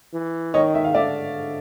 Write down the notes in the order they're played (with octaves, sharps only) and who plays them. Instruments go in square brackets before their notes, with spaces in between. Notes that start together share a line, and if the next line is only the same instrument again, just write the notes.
[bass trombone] E3
[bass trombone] D#3 [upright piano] C#5 D#5
[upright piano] E5
F5
[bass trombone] D3 [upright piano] D5 E5